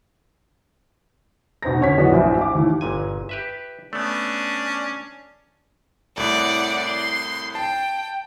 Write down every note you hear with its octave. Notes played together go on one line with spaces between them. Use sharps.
B2 D#4 C5 A#5 A#6
D3 C#4 C#5 B6
E3 F#3 B3 F#4 D5 D#5
A#1 A2 F#4 C5 D#5 E5
F5 D6
D#2 E3
G1 A#2 G#5
G4 B4 E5
A3 B3 C#4 D4
C2 A2 D5 F#5
C6
G5 A5